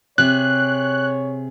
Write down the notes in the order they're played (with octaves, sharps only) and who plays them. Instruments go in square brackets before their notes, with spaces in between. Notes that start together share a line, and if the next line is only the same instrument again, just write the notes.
[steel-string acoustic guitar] C3 G#4 [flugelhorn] C#5 [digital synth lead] F#6